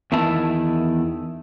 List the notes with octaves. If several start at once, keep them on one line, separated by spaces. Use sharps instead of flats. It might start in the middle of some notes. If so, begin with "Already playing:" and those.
E2 D#3 E4 E5 A5